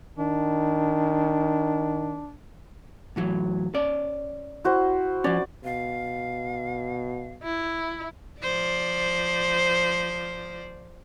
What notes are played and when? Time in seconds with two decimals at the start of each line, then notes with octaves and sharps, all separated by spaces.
0.18 D#3 D4
3.16 A2 E3 F#3
3.74 C#4 D5
4.65 E4 F#4 C5
5.24 F3 C#4 D5
5.64 B2 F5
7.43 E4
8.41 F3 C5 D5